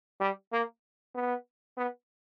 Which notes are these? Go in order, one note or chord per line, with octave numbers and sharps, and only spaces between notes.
G3
A#3
B3
B3